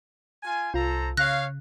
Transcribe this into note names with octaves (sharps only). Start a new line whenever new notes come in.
F4 G#5
C2 F4 A4 C5 A#5
C#3 C#5 F5 F#6 A#6